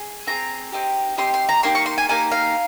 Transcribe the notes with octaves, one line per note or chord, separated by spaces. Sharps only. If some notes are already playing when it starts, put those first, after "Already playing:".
Already playing: G#4
C4 F4 G#4 A#5
C4 D#4 G4
C4 D#4 G4 C6
C6
A#5
A#3 D#4 G4 C6
C#6
C6
G#5
A#3 D#4 G4 G#5
F5